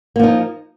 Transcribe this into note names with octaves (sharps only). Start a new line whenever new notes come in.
F3 A#3 D#4